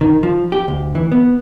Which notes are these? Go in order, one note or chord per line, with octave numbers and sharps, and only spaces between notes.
D#3
F3
G4
D2
E3
B3